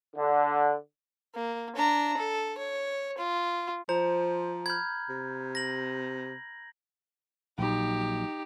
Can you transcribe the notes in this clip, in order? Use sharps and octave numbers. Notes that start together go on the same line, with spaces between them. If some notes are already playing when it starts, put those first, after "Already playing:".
D3
A#3
D4 A#5
A4
C#5
F4
F3 C5 A#5
B5 F6 G6 G#6
C3
A#6 F#7
A#1 A#2 F#3 D#4 G4